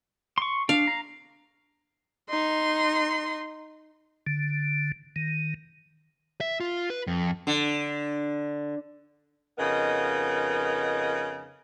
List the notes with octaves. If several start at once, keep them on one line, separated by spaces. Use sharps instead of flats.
C6 C#6
D4 F5
A#5
D#4 C6
D3
D#3
E5
F4
B4
F2
D3
F2 C#3 B3 D#4 A#4 D#5